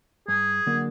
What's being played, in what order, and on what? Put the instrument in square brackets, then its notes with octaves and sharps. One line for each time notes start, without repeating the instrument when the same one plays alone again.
[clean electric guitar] G2 [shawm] G#4
[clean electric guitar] D3 F#3 A#3 D4